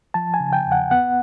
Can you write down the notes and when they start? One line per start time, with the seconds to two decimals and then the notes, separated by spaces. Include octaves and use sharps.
0.14 F3 A5
0.34 G#5
0.40 C#3
0.53 G5
0.66 E2
0.72 F#5
0.91 B3 F#5